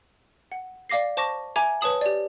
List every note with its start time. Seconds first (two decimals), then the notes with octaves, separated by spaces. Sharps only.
0.52 F#5
0.89 D5 F5 D6 A#6 C7
1.17 C5 A5 C#6 D6 A#6
1.56 E5 G#5 A#5 D6 G#6
1.81 B4 C#5 A5 D#6 F#7
2.01 G4 D5